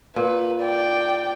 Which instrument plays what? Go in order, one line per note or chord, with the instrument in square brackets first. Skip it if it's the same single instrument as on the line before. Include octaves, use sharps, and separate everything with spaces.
[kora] A#2 [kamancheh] B4
[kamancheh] D5 G5